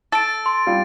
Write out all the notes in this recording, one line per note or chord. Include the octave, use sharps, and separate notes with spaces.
A4 A6 D7
C6
G3 F4